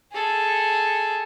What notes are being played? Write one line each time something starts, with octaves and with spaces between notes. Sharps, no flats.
G#4 A4